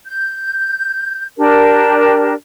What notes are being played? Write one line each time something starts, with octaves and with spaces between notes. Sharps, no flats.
G6
D4 G4 A#4